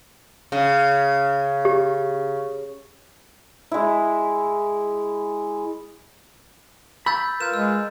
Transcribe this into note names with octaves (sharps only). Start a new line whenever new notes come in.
C#3
G4
G#3 E4
B5 E6 G6 A6
F4 A#4 B4 G6 E7
G#3 E6